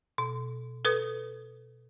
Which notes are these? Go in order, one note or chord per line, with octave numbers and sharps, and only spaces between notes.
B2
A4 B4 D#6